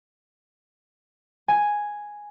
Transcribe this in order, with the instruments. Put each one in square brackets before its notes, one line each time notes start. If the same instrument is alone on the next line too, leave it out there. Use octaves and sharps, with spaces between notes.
[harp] G#5